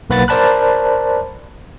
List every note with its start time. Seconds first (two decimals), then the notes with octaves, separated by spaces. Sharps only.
0.10 B1 A#3 B4 F#5 B5 A6
0.28 A#4 C5 D5 A5 B5 F#6